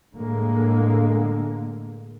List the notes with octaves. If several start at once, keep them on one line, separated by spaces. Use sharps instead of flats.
A2 D3 G#3 A#3